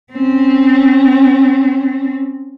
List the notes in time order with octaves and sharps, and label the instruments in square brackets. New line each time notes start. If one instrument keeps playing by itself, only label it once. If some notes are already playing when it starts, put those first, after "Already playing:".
[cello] C4 C#4